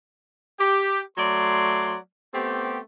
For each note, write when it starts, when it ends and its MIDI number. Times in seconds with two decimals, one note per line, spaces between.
0.60 1.01 67
1.17 1.96 54
1.17 1.96 57
1.17 1.96 74
1.17 1.96 84
2.34 2.79 57
2.34 2.79 59
2.34 2.79 60
2.34 2.79 67